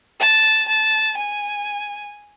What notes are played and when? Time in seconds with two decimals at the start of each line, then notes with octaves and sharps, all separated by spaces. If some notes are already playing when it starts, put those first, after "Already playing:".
0.20 A5
0.68 A5
1.17 G#5